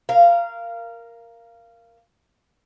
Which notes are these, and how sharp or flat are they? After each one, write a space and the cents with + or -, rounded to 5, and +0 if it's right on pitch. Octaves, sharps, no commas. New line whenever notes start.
A#4 +0 F5 -15